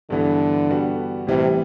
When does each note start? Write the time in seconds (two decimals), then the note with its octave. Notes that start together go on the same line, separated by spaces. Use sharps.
0.10 G2 D3 E3 B3
0.70 G3 B3 F#4
1.27 A2 C3 E3 G3